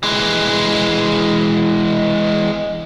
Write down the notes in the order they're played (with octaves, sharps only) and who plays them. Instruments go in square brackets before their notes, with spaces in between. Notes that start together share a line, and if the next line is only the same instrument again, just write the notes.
[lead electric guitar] E3 G#3